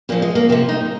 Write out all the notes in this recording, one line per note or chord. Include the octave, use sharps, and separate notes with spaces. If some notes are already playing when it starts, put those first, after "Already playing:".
A#2 F3 A#3
G#3
A#3
C3 F3 A#3
D#4